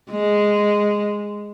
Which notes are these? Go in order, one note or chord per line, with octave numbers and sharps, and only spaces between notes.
G#3